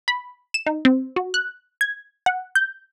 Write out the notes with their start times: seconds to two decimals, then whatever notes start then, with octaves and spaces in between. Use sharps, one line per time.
0.08 B5
0.54 E7
0.66 D#4
0.85 C4
1.16 F#4
1.34 F#6
1.81 G#6
2.26 F#5
2.55 G6